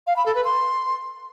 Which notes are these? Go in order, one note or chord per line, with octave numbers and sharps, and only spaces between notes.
F5
B5
A4
B4
C6